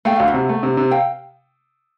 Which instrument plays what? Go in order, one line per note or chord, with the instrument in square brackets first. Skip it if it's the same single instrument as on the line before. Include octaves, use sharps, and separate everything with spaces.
[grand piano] A3 [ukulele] F5 G5
[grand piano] D2 [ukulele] F5
[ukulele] E5 F#5
[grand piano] C3
A3
C3
C3
[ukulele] F5 G5